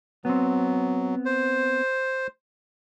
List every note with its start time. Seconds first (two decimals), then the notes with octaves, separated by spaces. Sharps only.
0.25 F#3 B3 C4
1.26 C5